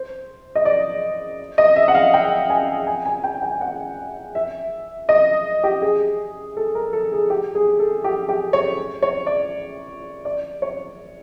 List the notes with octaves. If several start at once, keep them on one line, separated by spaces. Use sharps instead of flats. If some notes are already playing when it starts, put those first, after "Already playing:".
Already playing: C5
D#5
D5
D#5
E5
F#5
F5
G5
G#5
G#5
G#5
G5
G5
F#5
E5
D#5
G4
G#4
A4
A#4
A4
G#4
G4
G#4
A4
G4
G4
C#5
C#5
D5
D5
C#5